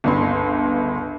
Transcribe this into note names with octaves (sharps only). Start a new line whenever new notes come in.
G1 C#2 C6